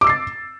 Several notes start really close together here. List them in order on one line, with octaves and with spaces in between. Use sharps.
D6 E6 C7 A6